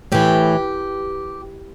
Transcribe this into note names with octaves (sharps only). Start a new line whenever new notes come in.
A2 E3 G4